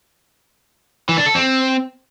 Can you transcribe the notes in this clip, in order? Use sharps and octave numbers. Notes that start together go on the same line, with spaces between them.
E3
D4
A4
C4